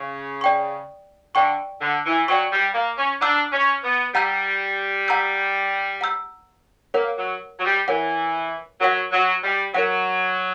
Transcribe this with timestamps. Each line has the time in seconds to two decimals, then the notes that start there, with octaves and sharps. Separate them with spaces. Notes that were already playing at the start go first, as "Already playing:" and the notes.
Already playing: C#3
0.41 D5 G5 C#6
1.35 D3 D5 G5 C#6
1.81 D3
2.05 E3
2.28 F#3 D5 G5 C#6
2.52 G3
2.74 A#3
2.98 C#4
3.21 D4 F#5 A#5 E6 G6
3.52 C#4
3.83 B3
4.14 G3 F#5 A#5 E6 G6
5.08 F#5 A#5 E6 G6
6.01 F#5 A#5 E6 G6
6.94 A#3 A#4 C#5 F#5
7.18 F#3
7.59 F#3
7.65 G3
7.88 E3 A#4 C#5 F#5
8.80 F#3 A#4 C#5 F#5
9.12 F#3
9.44 G3
9.74 F#3 A#4 C#5 F#5